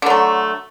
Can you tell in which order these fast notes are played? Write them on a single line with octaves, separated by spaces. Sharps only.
D3 F#3 A3